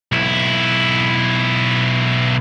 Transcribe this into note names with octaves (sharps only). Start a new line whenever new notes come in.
B1 E4